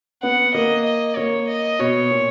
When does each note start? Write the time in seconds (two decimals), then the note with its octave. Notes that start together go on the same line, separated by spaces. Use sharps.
0.23 B3 F#5
0.54 A#3 D#5
0.85 D#5
1.16 A#3 C#5
1.48 D#5
1.79 B2 C#5
2.11 A#2